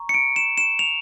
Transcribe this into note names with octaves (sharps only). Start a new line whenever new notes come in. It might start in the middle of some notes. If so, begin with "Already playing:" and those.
Already playing: A#5 C#6
C#7
D7
E7
E7
F7